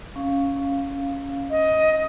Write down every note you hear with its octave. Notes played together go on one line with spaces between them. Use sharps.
C#4 F5
D#5